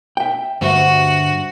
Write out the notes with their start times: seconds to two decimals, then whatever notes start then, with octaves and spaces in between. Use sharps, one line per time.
0.17 E5 G5
0.61 D2 G2 F#4 C5 E5 C#6